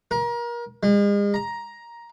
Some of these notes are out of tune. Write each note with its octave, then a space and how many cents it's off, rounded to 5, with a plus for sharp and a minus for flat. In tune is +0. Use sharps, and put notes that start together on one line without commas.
A#4 +30
G#3 -40
A#5 +10